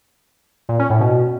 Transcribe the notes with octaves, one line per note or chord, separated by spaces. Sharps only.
A#2
C#4
A2
B2